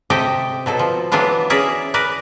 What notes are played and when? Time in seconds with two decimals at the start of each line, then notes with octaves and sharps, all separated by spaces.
0.10 C3 G4 A4 D#5 E5 G5
0.66 B2 F#3 A4
0.79 F3
1.12 E3 F#3 B3 D4 F4
1.50 C#4 G#4 A#4 D5 E5
1.94 A#4 B4 D5